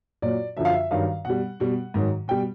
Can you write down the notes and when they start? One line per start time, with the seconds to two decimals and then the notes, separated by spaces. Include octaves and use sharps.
0.22 A#2 F#3 D5
0.57 F#2 D3 F3 E5
0.65 F5
0.73 E5
0.91 G2 D#3 F#3 F5
1.25 B2 G3 F#5
1.60 B2 G3
1.94 G#2 D#3 F#3
2.28 B2 G3 G5